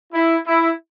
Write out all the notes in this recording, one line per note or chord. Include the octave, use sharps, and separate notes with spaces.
E4
E4